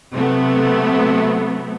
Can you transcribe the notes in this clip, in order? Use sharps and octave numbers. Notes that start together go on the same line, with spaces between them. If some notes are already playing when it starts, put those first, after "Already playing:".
C3 F#3 A3 B3